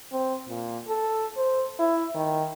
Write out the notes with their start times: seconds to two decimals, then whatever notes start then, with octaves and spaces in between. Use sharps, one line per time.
0.12 C4
0.48 A#2
0.88 A4
1.36 C5
1.79 E4
2.15 D#3